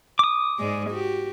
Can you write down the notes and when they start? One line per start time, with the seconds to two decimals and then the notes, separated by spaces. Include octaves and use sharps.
0.19 D6 D#6
0.59 G#2 G#3 D5
0.89 F#4 G4